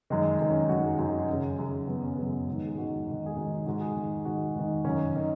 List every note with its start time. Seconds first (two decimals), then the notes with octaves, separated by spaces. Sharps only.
0.10 F#2 D#3 G#3
0.40 F#2 D#3
0.50 C#4
0.60 D#4
0.69 F#2 D#3 F#4
0.84 G#4
0.99 F#2 D#3 F#4
1.09 F#4
1.19 D#4
1.29 F#2 C#3 C#4
1.58 F#2 C#3
1.88 F#2 C#3 B3
2.03 C#4
2.14 B3
2.18 F#2 C#3 C#4
2.47 G#2 D#3
2.65 G#4
2.77 G#2 D#3 F#4
3.06 G#2
3.11 D#3
3.26 G#4
3.36 G#2 D#3 F#4
3.51 D#4
3.66 G#2 D#3 F#4
3.81 G#4
3.96 G#2 D#3
4.25 G#2 D#3 F#4
4.55 G#2 D#3
4.85 F#2 D#3 C#4
5.16 D#3